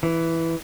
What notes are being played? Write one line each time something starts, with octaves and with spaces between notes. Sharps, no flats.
E3